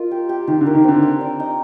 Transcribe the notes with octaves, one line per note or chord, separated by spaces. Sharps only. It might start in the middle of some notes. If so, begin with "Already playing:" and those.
Already playing: F4 A#4 D#5
G4
G4
D#3 G4
D3
A#4
D#3
D3 C4
G4
D5
D#4